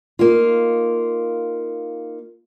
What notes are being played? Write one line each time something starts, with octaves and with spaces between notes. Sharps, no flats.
A#3 D#4 F4